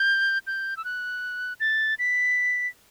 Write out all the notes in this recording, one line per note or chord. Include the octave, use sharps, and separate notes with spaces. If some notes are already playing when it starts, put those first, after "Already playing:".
Already playing: G6
G6
E6
F#6
A6
B6